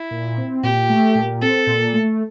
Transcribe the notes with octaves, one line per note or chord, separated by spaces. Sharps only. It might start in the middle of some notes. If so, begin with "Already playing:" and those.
Already playing: E4
A#2
C4
A#2 G4
A3
A#2
C4 A4
A#2
A3